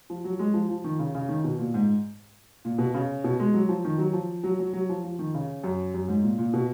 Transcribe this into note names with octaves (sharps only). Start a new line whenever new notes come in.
F3
F#3
G#3
F3
F3
D#3
C#3
C#3
D#3
B2
A#2
G#2
A#2
B2
C#3
B2
G#3
F#3
F3
D#3
F#3
F3
F#3
F#3
F#3
F3
F3
D#3
C#3
F#2
F#2
G#2
A#2
A#2
B2